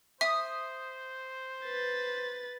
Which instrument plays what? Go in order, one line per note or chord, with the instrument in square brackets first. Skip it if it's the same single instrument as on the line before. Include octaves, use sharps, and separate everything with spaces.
[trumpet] C5 [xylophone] E5 [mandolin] D#6
[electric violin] B4 A6